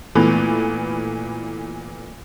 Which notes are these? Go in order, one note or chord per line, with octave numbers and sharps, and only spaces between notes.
A#2 E3 A3 B3